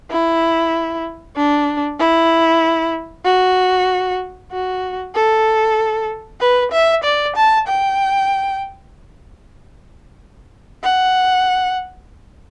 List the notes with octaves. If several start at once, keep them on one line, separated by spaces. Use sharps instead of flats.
E4
D4
E4
F#4
F#4
A4
B4
E5
D5
A5
G5
F#5